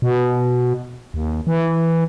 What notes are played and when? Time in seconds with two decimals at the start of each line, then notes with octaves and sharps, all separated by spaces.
0.02 B2
1.14 D#2
1.47 E3